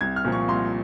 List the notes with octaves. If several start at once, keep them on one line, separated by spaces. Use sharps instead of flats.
C2 G#6
F6
A#2 F3
C#6
C2 C6